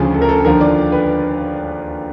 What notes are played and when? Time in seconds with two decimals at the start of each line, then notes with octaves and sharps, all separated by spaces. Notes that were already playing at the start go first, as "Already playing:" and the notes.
Already playing: D2 C#3 F3 G#4
0.14 A4
0.22 A#4
0.29 A4
0.45 D#2 D3 F3 A#4
0.61 D5
0.92 B4